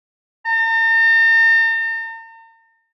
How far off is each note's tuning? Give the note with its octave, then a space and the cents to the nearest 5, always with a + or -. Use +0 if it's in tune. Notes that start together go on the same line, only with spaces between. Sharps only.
A#5 -45